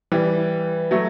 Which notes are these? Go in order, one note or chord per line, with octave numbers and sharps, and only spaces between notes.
E3 G3
F#3 A3